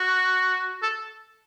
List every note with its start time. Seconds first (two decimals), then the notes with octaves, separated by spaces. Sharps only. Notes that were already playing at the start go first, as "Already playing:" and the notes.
Already playing: F#4
0.83 A4